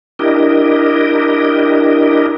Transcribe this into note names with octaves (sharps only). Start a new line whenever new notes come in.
D4 E4 G4 A#4 D#5